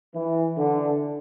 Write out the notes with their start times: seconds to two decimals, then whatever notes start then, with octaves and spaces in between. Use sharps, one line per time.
0.15 E3
0.57 D3